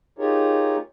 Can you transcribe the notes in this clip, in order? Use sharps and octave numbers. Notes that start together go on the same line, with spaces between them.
D#4 F4 G4 G#4 A#4 C#5